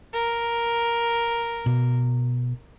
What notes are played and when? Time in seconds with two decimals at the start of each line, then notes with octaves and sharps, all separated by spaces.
0.13 A#4
1.66 B2